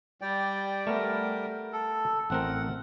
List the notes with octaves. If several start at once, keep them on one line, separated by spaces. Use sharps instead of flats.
G3 D5 G5
G3 A3 B3 A#4
A4
A1 C4 A#4 F#5